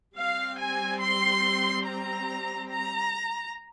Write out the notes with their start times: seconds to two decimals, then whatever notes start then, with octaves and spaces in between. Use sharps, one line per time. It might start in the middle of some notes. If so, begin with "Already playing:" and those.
0.16 G3 C4 F5
0.58 G#5
1.01 C6
1.85 A#5
2.70 A#5